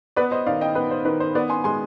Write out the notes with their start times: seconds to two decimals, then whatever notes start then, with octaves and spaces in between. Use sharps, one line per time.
0.16 B3 B4 D5
0.31 C5 D#5
0.46 D#3 D5 F5
0.61 D#5 G5
0.75 B3 B4
0.91 C5
1.05 D#3 B4
1.20 C5
1.35 B3 B4 D5
1.50 G#5 C6
1.64 G#3 G#5 C6